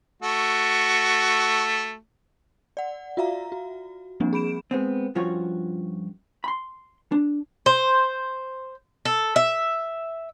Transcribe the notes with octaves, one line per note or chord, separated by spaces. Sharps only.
A3 F#4
D5 F#5
F4 F#4 E5 F5 A#5
F#4
F3 G3 A#3 C4 D4
G#4 B5 D7 E7
G#3 B3 C4
G2 F3 C#4 F4 F#4 C#5
B5 C6
D4
C5
A4
E5